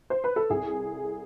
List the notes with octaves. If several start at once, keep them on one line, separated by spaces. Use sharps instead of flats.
C5
B4
A4
C2 G#4